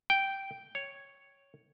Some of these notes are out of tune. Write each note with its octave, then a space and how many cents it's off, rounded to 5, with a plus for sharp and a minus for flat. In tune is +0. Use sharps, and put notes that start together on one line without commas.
G5 -5
C#5 +0